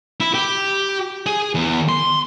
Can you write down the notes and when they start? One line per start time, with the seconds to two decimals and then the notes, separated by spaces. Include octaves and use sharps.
0.20 E4
0.34 G4
1.26 G#4
1.55 E2
1.89 C6